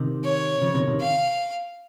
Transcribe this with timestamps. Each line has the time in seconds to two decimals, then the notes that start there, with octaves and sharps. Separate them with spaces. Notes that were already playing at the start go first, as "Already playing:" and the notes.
Already playing: C3 D#3
0.24 C#5
0.62 C#3 F3
0.74 C3 D#3
0.82 C#3
0.88 C3 D#3
1.00 F5